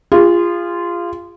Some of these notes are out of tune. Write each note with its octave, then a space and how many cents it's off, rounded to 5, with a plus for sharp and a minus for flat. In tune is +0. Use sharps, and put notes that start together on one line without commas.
F4 -15 G#4 -35